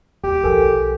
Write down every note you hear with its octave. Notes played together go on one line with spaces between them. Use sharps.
D#2 G4
B1 F3 A4 A#4 G#5